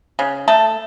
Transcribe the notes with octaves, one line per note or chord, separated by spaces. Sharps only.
C#3
A3 A4